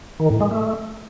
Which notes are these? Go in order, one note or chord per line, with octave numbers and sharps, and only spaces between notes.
D#3
A2
G#3
A3